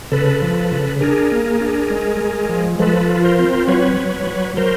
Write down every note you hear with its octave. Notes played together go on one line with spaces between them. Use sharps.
C#3 A4 B4
F3
C#3
D4 G#4 A#4
A#3
D4
G#3
G#3
F3
F3 A4 B4
F4
A#4 C5
C4
F#3 B4 C#5
F#3
F#3
F#3 A#4 C5